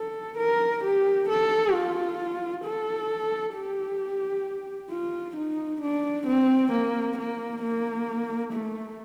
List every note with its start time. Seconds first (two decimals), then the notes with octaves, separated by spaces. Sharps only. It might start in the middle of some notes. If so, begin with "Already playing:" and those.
Already playing: A4
0.38 A#4
0.84 G4
1.29 A4
1.73 F4
2.64 A4
3.55 G4
4.91 F4
5.36 D#4
5.81 D4
6.27 C4
6.72 A#3
7.18 A#3
7.63 A#3
8.53 A3